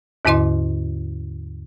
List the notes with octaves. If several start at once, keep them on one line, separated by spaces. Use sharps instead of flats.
D#2 G#2 D3 E4 D#5 C6